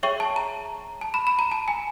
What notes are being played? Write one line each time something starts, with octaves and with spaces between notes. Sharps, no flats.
G#4 C#5 E5 G5 C#6
A5
A#5
A5
B5
B5
A#5
A5
G#5